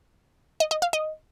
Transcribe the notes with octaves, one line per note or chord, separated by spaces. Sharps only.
D#5
D#5
F5
D#5